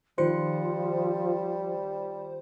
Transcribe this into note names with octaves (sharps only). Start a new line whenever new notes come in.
D#3 F3 G3 F4 C5 C6 C#7